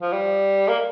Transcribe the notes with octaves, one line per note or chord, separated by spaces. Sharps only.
F3
G3
A#3